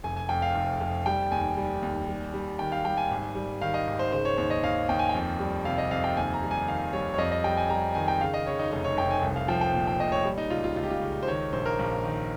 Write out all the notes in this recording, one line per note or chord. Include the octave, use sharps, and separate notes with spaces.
F1 G#5
G#5
F2 G5
F5
F1
F1
G3 G5
D#2 G#5
G3
D#2
G3
G3
D#3 G5
F5
G3 G5
G#5
G#1
G3
D#3 F5
D#5
G#1
C5
C#3 C5
C#5
D#2 C#5
D#5
D#2 F5
D#2 G5
G#5
G5
F2
G3
C3 F5
D#5
F2 F5
G5
D#2 G#5
A#5
G3
G#5
D#3 F5
G3 C#5
C#5
F2 D#5
D#5
G3 G5
G#5
G3 A#5
D#3 G#5
G5
C#3 F5
D#5
C#3 C#5
D#4
F1 D#4
C#5
F1 G5
G#5
C2
F5
F3 G5
G5
A#2
G5
A#2 D#5
C#5
G3
D#4
C#2 F4
F4
C#2 F4
G4
F4
C#3
C5
D#3 C#5
A#1 C5
A#4
A#1
D#3